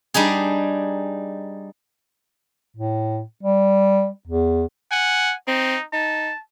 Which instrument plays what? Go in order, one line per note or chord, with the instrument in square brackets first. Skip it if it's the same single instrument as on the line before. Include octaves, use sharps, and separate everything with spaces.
[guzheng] G3 D4 D#4 G#4
[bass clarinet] A2
G3
E2
[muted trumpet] F#5 [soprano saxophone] G#5
[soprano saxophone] C4 [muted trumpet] D#4
[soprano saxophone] D#4 [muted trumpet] A5